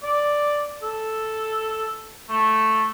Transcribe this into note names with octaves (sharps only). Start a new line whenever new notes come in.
D5
A4
A3